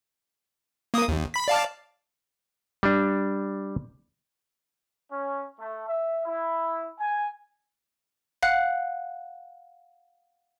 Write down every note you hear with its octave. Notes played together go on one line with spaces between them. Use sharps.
A#3 D#6
D#2
B5 B6
D5 F5 A5
G3 D4
C#4
A3
E5
E4
G#5
F5 F#5 F#6